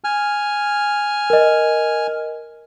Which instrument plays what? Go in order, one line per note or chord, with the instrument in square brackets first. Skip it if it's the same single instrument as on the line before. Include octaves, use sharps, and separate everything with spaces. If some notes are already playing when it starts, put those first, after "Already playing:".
[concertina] G#5 F6
[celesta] A#4 D#5